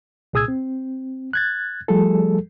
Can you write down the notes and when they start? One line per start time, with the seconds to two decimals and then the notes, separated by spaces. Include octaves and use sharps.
0.33 C2 A#2 G#4 D#6 E6 G#6
0.48 C4
1.33 F#6 G#6 A6
1.88 F3 G3 A3 G#4 A4